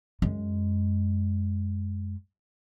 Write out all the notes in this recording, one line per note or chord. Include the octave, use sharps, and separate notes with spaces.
F#2 G#3